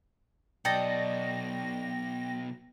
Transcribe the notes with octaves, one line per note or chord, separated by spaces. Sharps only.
B1 B2 A4 D5 D#5 G5 A#6